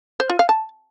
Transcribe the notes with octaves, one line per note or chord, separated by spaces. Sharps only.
C5
F4
F5
A5